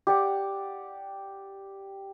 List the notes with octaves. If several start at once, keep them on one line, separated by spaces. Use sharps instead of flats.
G4 D5 F#5